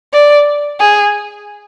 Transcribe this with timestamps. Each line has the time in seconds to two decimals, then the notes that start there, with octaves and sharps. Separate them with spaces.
0.13 D5
0.79 G#4